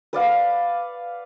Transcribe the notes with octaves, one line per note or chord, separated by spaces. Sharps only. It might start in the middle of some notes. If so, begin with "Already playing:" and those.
B4 D5 F5 F#5